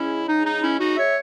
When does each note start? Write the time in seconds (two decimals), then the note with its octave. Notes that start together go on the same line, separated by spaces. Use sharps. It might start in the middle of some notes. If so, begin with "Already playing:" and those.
Already playing: C#3 G#3 C#4 E4
0.29 D#4
0.46 D#4
0.63 C#4 E4
0.80 D#4 F#4
0.97 C#5 E5